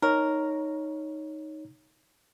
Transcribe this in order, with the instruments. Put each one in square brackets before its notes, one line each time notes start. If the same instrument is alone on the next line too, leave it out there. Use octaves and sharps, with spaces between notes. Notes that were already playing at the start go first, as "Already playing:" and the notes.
[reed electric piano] D#4 C#5 [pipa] A#4